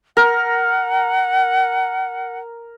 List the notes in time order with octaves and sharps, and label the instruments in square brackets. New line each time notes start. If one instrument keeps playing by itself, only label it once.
[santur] A#4 [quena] F#5